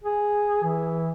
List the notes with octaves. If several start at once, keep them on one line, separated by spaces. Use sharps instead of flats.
G#4
E3